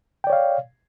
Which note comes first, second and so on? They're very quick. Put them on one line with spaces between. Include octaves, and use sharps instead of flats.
G5 D5 C#5 F5